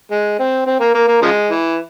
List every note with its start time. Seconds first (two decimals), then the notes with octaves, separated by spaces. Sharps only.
0.11 G#3
0.39 C4
0.66 C4
0.80 A#3
0.94 A#3
1.08 A#3
1.22 C#3 F3 G#3
1.49 E3